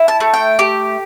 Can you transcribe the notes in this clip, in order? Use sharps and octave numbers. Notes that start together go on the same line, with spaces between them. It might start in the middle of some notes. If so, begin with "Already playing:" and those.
Already playing: E4
A5
A3
G5
G4